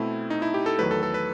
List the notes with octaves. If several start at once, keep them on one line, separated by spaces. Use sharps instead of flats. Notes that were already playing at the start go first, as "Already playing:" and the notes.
Already playing: B2 A3 C4 E4
D#4
E4
G4
A4
E2 D#3 F#3 A3 B4
A4
A4
B4